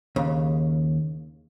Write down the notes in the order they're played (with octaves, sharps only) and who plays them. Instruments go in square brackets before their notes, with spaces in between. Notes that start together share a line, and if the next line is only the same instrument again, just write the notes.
[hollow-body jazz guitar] D#2 C#3